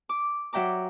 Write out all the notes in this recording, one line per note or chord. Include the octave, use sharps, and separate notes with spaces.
D6
F#3 E5 G5 A#5 D6